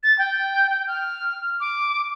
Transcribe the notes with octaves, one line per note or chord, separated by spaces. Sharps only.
A6
G5
G5
F6
D6